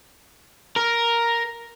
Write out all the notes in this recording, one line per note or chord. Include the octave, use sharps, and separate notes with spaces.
A#4